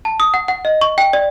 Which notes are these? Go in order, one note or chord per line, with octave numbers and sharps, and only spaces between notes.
A5
D#6
F#5
F#5
D#5
C#6
G5
D5